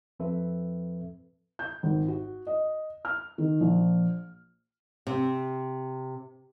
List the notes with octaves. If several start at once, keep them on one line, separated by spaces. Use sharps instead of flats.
F2 F3 C4 A4 B4 E5
G6
G#1
F#4
D#5
F6
D#3
A#1
C3